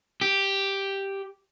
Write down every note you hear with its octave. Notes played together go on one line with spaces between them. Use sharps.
G4